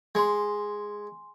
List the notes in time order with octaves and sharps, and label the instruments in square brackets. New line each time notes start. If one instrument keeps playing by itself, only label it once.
[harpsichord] G#3 [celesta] G#5 C6